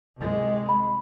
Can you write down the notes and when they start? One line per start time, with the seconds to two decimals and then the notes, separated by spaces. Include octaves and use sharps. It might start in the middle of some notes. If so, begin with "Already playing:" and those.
0.18 C2 G#3
0.69 B5